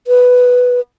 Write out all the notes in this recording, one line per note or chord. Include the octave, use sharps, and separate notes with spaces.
B4